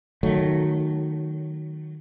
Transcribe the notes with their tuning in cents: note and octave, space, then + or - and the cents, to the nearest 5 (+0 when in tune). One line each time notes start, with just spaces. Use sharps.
D#3 -15 F#3 +0 A3 +0